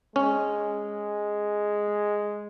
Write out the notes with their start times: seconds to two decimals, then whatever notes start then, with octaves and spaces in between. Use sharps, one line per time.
0.16 G#3 C#4